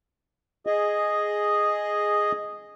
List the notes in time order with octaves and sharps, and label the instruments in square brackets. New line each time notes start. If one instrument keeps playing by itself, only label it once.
[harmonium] G#4 D#5